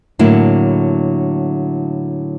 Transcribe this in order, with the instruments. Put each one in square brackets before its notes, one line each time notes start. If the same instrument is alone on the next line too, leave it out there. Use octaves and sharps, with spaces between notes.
[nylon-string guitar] A2 D3 F#3 A#3 E4